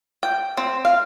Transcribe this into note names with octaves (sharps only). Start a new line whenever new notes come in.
G5
C4
F5